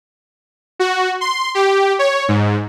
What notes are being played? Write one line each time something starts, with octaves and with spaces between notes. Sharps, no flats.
F#4
C6
G4
C#5
G#2